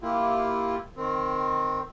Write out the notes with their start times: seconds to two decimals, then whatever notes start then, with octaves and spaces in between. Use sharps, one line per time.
0.02 A#3 E4 F4 G4
0.96 D#3 C4